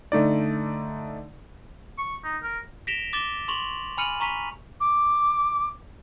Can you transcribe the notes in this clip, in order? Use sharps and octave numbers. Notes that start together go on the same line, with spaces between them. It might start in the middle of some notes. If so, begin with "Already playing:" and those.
D3 A3 D#4 D5
C#6
D#4
A#4
A#6 B6 D7 E7 F7 G7
D6 A6 E7 G7
C6 C#6 F7 F#7
G#5 B5 F6 C#7 D#7 F#7
A#5 C#6 B6 D#7 F7
D6